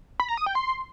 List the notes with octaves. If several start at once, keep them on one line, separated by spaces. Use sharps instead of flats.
B5
A#5
D#6
G5
C6